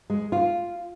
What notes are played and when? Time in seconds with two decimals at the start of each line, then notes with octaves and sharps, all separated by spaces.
0.10 G#3
0.32 F4